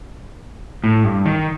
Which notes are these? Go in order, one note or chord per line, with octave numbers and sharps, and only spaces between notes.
A2
G2
D#3